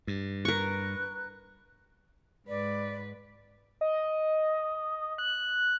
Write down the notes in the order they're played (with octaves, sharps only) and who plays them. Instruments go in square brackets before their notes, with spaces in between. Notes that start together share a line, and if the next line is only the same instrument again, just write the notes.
[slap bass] G2
[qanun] A#4 C#6 [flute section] B4 F#6
[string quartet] G#2 B4 [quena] D5
[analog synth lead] D#5
F#6